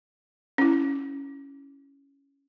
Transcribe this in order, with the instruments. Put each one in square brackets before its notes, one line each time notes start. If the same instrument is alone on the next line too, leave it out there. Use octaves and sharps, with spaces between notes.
[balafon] C#4 E4